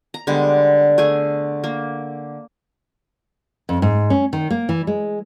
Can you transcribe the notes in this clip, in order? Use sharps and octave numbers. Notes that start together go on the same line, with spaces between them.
A#5
D3 G3 G#3 B3
A3 G#4 G#5
A#3
F2
G#2
C#4
D#3
A#3
E3
G#3